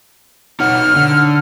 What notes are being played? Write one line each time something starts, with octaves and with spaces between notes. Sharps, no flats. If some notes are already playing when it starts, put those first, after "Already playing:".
D#4 C#5 F#5 F6
D3